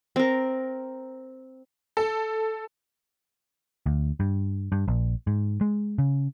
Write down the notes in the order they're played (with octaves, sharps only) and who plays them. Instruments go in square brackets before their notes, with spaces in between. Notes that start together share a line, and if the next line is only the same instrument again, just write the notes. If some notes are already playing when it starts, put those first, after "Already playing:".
[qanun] C4 A#4
[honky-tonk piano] A4
[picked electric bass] D2
G2
G2
A#1
G#2
G#3
C#3